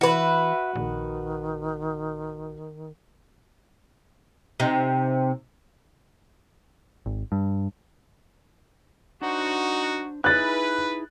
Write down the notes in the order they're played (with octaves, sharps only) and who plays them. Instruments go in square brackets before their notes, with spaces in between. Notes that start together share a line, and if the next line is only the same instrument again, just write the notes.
[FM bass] E3 [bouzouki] F#4 B4 [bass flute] E5
[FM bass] A#1 [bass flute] D#3
[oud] C3 D#4
[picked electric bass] G#1
G2
[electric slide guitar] D4 C5 [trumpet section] D#4 F#4
[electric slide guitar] D#4 E4 G#4 [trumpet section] B4 [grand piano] F#6 A6